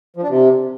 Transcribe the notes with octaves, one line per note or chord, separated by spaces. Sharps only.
F3
D4
C3